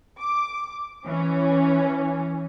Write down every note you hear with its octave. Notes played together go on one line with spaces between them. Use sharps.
D6
E3 C#4